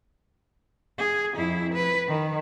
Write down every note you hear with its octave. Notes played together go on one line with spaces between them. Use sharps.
G#4
F2 E4
B4
D#3